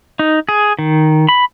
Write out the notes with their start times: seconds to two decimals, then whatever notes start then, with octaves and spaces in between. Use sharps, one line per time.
0.19 D#4
0.49 G#4
0.79 D#3
1.29 B5